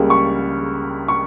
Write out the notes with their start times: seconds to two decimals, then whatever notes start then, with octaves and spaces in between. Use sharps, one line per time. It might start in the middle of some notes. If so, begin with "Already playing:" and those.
Already playing: C#2 C#3 G3 A#3
0.10 C#6
1.08 C#6